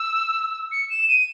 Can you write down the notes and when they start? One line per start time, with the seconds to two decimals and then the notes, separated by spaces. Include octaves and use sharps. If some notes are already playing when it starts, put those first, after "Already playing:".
Already playing: E6
0.72 C#7
0.90 E7
1.09 D#7